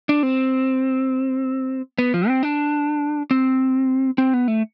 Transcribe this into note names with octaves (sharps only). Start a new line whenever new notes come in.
D4
C4
B3
F3
C4
D4
C4
C4
B3
A3